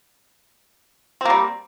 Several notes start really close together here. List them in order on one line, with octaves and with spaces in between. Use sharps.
C4 A#3 G3